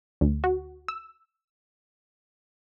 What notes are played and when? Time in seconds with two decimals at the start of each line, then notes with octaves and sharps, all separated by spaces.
0.21 D2
0.44 F#4
0.88 E6